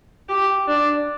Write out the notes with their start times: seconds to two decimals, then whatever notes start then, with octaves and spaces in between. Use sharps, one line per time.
0.29 G4
0.68 D4